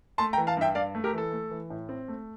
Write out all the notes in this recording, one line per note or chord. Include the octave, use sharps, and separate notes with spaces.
A3 A5 C6
G5 A#5
E3
F5 A5
G2 E5 G5
G2 D5 F5
A3
G4 A#4
E3 A4
A3
E3
A2
C4
A3